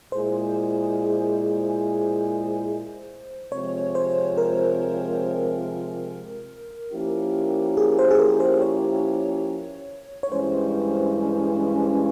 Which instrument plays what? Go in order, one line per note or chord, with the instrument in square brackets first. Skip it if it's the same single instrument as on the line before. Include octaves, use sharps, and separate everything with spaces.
[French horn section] A#2 G#3 E4 G#4 [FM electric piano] C5
[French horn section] C3 F3 G#3 C4 F4 [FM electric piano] C#5
[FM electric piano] C5
A#4
[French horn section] F3 A#3 C#4 E4 G4
[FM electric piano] G#4
C5
G#4
A#4
C5
C#5
C#5
[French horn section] G2 E3 G#3 C#4 [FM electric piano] C5